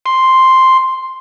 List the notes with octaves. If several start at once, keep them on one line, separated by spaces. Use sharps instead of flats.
C6